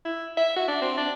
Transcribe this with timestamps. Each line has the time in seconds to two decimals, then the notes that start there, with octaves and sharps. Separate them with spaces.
0.05 E4
0.37 E5
0.56 F#4
0.68 D4
0.82 C4
0.97 D4